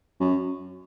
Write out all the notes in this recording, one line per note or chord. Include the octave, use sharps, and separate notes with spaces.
F#2